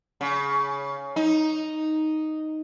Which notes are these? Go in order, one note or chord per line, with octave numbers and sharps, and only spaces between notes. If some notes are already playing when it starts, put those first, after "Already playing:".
C#3
D#4